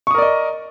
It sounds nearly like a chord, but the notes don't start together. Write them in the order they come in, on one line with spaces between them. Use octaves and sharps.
C#6 D#6 A#4 D5 D#5